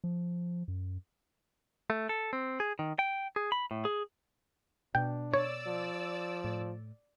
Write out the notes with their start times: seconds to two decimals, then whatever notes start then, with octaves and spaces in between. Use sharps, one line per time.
0.04 F3
0.68 F#2
1.90 A3
2.09 A4
2.33 C4
2.60 G#4
2.79 D#3
2.99 G5
3.36 G#4
3.52 B5
3.71 A2
3.85 G#4
4.95 B2 D4 G5
5.34 C#5 D5 E6
5.67 F3
6.44 A2